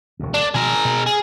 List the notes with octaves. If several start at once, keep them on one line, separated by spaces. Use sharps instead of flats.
E1 D2
D4
B2 D#3 F3 G#4 A#4
B2
G#4